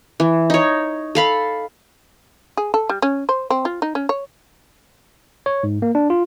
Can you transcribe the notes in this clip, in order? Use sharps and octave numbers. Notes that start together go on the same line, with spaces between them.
E3
D#4 C#5
A4 F5 B5
G#4
A4
G3
C#4
C5
C4
F4
D#4
C#4
C#5
C#5
G#2
A#3
D4
F4